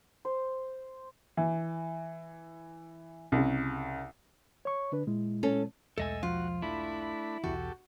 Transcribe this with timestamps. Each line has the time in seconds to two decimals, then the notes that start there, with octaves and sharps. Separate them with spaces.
0.25 C5
1.37 E3
3.32 C2 C#3
4.65 C#5 C#6
4.92 D3 D4 B4
5.07 A#2 G#3 E4
5.43 C#4 A4
5.98 B1 E2 G#3 A3 A4 D#5 G#5 E6
6.23 F3 F4 F#4
6.62 A3 D4 E4 B5
7.44 B1 E2 E3 F#4 G4 A4